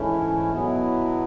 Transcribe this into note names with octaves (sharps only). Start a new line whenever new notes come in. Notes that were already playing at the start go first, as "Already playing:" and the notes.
Already playing: G#2 E3 A3 C#4 E4
B2 F#3 B3 E4